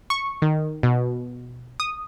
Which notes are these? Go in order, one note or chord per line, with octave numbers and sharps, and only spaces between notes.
C#6
D#3
B2
D#6